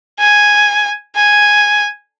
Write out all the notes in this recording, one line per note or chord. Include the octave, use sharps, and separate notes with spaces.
G#5
G#5